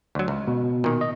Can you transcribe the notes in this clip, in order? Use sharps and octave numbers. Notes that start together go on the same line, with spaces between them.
D2 F#3
C#2
B2
A#2 D#3
D#5